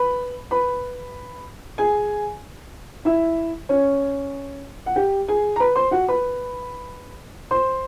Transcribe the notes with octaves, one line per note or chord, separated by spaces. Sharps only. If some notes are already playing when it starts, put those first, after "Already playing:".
Already playing: B4 B5
B4 B5
G#4 G#5
E4 E5
C#4 C#5
F#5
G4 G5
G#4 G#5
A#5
B4 B5
C5 C6
F#4 F#5
B4 B5
C5 C6